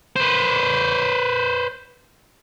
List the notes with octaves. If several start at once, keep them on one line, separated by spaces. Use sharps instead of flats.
B4 C5